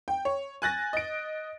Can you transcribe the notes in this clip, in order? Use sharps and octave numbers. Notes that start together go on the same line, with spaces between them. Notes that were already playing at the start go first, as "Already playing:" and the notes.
G5
C#5
G#5 F#6 A6 A#6
D#5 D7